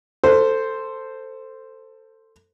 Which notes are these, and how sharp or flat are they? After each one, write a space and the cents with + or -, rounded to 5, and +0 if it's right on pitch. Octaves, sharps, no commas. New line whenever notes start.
A4 +20 C5 +0